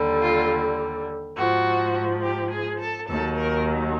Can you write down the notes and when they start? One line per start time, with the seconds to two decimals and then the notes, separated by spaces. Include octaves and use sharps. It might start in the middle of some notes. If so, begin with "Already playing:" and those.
Already playing: D#2 D3 G3
0.22 F4
1.36 G#2 F3 F#4
2.23 G4
2.51 G#4
2.80 A4
3.08 D#2 D#3 F#3 A4
3.37 A#4